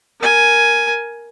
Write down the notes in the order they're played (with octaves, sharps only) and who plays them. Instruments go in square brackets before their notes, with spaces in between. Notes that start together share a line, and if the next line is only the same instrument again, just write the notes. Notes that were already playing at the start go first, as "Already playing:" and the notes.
[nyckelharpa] A#4 G#5